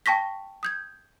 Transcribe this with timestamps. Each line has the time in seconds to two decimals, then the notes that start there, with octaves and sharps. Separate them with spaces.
0.06 G5 A5 C#6 A#6 B6
0.63 D#6 G6 G#6